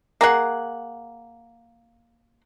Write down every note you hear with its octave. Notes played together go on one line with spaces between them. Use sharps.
A#3 G#4 F#5